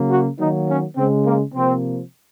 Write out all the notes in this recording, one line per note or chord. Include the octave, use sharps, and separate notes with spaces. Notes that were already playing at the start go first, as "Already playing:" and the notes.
Already playing: C#3 F#3 A#3
F#4
D#3 F#3 A#3 D#4
C#4
C#3 G#3 C4
A#3
C3 F3 A#3 C4